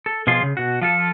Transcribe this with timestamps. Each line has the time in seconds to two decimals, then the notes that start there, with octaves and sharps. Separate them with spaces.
0.06 A4
0.27 B2 F3 F4 G#4
0.43 C#3
0.57 B2 F#4
0.82 F3 F4 A4